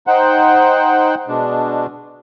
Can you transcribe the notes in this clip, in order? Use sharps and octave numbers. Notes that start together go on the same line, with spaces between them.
D#4 C5 F#5 G5
B2 G#3 D4